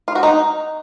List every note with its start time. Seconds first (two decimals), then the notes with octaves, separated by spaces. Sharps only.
0.08 F4
0.15 F#4
0.23 D#4